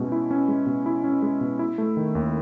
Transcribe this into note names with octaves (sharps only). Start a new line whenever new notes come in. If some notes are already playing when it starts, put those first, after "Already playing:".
Already playing: B2 G#3 C#4 E4
E4
C#4
G#3
B2
E4
C#4
G#3
B2
E4
A3
D#3
D#2